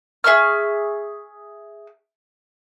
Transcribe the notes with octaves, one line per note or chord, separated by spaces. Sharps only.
G#4 E5 C#6 F6